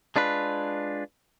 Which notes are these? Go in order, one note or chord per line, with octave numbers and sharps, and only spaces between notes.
G#3 D4 F4 B4